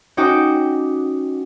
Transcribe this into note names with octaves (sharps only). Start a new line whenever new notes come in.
C#4 D#4 F#4 G5 D6 D#7